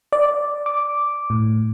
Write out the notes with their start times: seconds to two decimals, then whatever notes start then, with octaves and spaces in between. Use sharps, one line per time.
0.13 D5
0.66 D6
1.30 A2